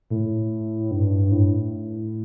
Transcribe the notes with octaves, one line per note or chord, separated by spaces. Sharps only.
A2
G2
A2